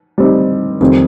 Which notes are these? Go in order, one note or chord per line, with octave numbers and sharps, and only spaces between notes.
G3 C4 D#4
F2 D#3 G3 C4